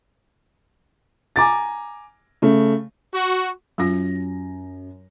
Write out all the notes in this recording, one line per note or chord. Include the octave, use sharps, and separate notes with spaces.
G#5 A#5 D6 A6
C#3 A3
F#4
F#2 F#3 F4 A#6